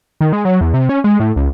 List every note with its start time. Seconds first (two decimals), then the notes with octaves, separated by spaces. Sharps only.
0.21 D#3
0.33 G#3
0.45 F#3
0.61 E2
0.74 C3
0.89 C#4
1.04 G#3
1.20 A2
1.36 C#2